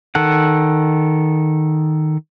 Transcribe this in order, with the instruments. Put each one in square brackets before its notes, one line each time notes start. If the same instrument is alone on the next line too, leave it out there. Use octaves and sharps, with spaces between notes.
[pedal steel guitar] D#3 A4 F#5